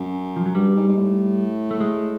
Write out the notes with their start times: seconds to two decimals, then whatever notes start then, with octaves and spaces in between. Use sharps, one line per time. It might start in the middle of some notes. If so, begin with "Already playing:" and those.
Already playing: F#2
0.36 F3
0.46 F#3
0.55 G2 G3
0.76 G#2
0.88 G#2
0.97 A2
1.71 A3
1.80 G#3